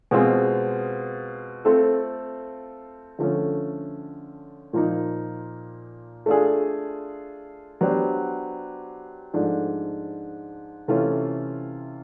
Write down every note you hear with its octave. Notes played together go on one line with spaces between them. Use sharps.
B2 G#3 C4 F4 G#4
A3 C4 F4 A4
D3 F3 A3 C#4
A#2 F3 A#3 D#4
A3 D4 F4 G#4
F#3 B3 D4 G4 C5
G#2 F3 A3 D4
C3 E3 A3 C#4 F4